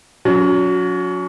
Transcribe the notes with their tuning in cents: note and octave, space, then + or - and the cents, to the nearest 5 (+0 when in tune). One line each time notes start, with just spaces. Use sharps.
F#3 -25 C#4 +30